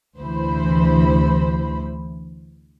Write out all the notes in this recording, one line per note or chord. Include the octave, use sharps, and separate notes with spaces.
D2 C3 E3 C5 B5